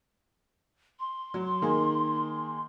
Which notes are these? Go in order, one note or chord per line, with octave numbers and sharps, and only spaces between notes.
C6
F#3
D#3 A#3 G#4